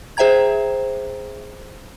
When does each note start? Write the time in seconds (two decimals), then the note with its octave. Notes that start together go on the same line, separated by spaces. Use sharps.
0.17 G#4 C5 E5 G5 A#5 G#6